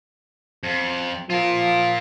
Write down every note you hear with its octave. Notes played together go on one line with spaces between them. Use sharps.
F2
F3 F4 A#4